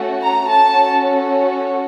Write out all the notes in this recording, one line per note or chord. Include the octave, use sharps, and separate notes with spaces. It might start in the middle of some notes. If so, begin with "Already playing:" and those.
Already playing: A3 C#4 F#4 A4
A#5
C#4 F#4 A4 A5